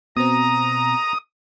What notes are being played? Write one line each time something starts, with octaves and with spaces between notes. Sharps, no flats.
B2 C4 A#5 D#6